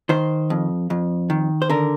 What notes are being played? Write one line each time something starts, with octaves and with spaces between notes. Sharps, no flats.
D#3 C5
F2
F2
D#3
C5
D3 A#4